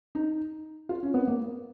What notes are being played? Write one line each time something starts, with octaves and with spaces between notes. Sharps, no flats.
D#4
F4
C#4
B3
A#3